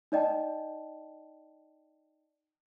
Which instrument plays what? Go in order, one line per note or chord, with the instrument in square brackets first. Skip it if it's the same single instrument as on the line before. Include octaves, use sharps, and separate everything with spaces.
[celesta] D#4 D5 D#5 G5 A5